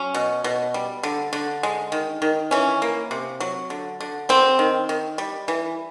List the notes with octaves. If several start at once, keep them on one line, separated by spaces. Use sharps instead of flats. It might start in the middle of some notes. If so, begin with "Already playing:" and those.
Already playing: F#3 C#4
B2
B2
G3
D3
D3
G#3
D#3
D#3
E3 C#4
A#3
C3
F#3
D3
D3
G3 C4
D#3
D#3
G3
E3